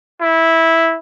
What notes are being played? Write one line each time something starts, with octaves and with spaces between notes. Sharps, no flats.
E4